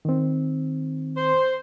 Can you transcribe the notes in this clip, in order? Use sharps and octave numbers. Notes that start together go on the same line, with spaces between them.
D#3 C4
C5